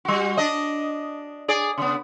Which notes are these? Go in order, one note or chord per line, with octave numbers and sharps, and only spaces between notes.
G3 F#4
D4 D#5
G#4 D5
C#3 B3